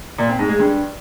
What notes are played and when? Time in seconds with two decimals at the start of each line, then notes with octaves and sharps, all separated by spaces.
0.18 A#2
0.29 C4
0.39 G#2
0.49 G#3
0.60 G2